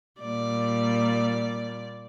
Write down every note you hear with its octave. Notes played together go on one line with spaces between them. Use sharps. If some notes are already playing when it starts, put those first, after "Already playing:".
A#2 G3 D5